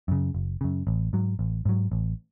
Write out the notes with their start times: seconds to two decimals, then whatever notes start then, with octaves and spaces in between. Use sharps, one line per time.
0.08 F#2 C#3
0.34 F#1
0.61 F#2 C#3
0.87 A1
1.13 G#2 F#3
1.39 A1
1.65 G#2 F#3
1.92 A1